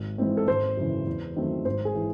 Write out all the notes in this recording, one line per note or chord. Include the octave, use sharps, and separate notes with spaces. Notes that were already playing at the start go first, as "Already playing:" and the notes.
Already playing: G#1
G#2 E3 C4
A4
G#1 C5
F#2 C#3 E3
E2
D#3 F#3 A3 C4
G#1 C5
G#4
E3